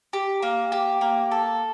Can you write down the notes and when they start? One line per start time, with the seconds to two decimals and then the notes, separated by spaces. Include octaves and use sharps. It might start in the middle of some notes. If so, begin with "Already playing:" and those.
0.13 G4
0.43 A#3
0.72 G4
1.01 A#3
1.31 A4